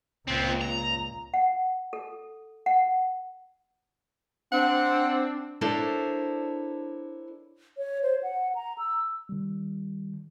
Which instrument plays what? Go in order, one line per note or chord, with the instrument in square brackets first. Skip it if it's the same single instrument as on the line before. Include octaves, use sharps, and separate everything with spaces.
[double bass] C#2 A#2 [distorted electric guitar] B3 C4
[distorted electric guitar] A#5
[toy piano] F#5
A4
F#5
[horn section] C4 [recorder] D4 [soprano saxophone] F#5
[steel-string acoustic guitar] D4 E4 A4 A#4 C5 C#5
[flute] C#5
C5
F#5
A#5
E6
[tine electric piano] D#3 G3